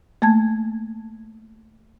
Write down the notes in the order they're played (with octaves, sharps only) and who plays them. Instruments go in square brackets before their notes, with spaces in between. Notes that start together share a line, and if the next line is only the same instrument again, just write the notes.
[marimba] A3 A#3 A5 G#6